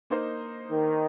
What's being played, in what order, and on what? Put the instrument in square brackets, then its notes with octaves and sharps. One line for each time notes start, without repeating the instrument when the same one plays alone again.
[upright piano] A#3 D#4 C5 D#5
[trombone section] D#3